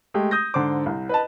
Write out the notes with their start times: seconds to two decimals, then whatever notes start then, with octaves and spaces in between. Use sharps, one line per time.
0.14 G#3 A3 G4
0.31 D#6 G6 A#6
0.54 G#2 D3 C5 D6
0.86 C2
1.09 B4 D#5 A5